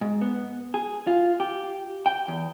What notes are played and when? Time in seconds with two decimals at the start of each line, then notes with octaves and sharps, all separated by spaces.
0.01 G#2
0.21 B3
0.74 G#4
1.07 F4
1.40 G4
2.06 G5
2.28 E2